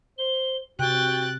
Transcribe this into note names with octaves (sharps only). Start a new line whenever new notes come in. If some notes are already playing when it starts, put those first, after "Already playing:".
C5 G7
C3 F#4 G5 F#6 A6